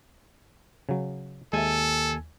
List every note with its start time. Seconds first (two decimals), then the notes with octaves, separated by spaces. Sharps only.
0.89 C#3 F#3
1.53 D#2 G#3 A4 E5 G#5 G#6